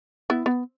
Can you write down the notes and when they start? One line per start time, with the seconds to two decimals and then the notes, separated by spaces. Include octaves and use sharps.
0.30 B3 E4
0.46 B3